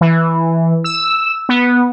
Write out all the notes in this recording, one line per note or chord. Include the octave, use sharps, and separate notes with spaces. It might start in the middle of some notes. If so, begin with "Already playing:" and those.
E3
E6
B3